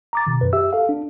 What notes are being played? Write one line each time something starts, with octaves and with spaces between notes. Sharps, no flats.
A#5 D6 A6
B2 D#3
F#2 B4
G4 E5 E6
A4 F5
D4